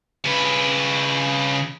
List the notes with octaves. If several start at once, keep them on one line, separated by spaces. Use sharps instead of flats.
C#3 B4